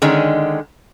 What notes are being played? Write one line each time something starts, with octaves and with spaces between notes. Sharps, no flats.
D3 D#3 G#3 C#4